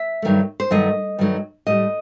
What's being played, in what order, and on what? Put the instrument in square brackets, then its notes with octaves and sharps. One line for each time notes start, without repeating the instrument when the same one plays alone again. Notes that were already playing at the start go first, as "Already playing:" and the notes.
Already playing: [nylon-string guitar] E5
G2 D#3 F#3 A3
C5
G2 D#3 F#3 A3 D#5
G2 D#3 F#3 A3
A2 G3 D#5